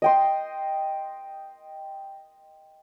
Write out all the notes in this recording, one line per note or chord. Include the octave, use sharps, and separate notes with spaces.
D#5 G5 C6